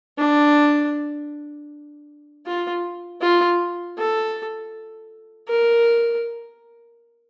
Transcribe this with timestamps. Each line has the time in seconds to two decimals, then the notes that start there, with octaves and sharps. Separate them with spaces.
0.18 D4
2.46 F4
3.21 F4
3.98 A4
5.48 A#4